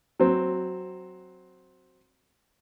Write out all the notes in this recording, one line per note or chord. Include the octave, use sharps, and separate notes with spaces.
F#3 C4